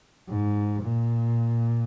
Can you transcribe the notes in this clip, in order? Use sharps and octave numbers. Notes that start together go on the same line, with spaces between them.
G#2
A#2